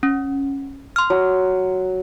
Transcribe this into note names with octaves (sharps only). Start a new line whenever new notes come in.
C#4
C6 F6
F#3